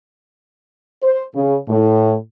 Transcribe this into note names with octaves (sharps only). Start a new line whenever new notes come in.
C5
C#3
A2